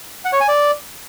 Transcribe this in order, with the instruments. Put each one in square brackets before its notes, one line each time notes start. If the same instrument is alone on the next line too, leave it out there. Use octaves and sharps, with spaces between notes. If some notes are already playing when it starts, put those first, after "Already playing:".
[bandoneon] F#5
C#5
G#5
D5